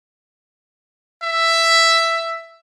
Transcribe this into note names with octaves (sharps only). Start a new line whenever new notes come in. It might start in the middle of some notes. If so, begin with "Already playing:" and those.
E5